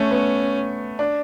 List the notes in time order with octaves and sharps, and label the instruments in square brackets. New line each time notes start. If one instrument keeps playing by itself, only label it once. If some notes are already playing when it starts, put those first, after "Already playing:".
Already playing: [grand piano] A3 [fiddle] C#4
[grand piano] B3
D4